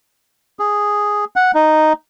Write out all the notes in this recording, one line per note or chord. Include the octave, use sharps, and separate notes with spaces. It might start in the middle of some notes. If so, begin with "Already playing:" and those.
G#4
F#5
D#4